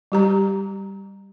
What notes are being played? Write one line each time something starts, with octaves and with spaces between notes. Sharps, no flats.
G3 G4 A#5